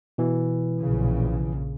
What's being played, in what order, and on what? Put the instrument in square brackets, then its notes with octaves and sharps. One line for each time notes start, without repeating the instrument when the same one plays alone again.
[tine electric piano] B2 E3
[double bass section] A#1 C#3